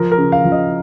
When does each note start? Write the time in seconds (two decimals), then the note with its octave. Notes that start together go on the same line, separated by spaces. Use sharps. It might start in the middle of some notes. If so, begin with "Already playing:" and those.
Already playing: F3 A#4
0.12 A#4
0.18 C#3
0.32 F5
0.45 F3
0.52 D#5